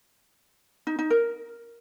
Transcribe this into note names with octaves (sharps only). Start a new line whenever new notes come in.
D#4
D#4
A#4